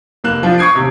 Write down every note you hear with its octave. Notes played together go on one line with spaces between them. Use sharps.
F1 A#3 F#6 E7
F3 D4 F4
C#6 D#6 G#6 C7 D7
D#2 C3